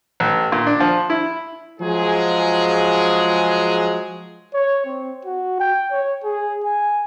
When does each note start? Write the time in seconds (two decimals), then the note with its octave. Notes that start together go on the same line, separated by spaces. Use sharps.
0.20 A1
0.52 A#2
0.67 D4
0.80 F3
1.10 E4
1.80 F3 F#3 G#3 G#4
4.54 C#5
4.86 C4
5.25 F#4
5.59 G5
5.91 C#5
6.23 G#4
6.64 G#5